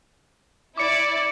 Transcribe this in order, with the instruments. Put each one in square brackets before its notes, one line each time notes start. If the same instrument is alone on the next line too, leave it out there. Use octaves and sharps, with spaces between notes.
[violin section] E4 D5 [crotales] D6 C#7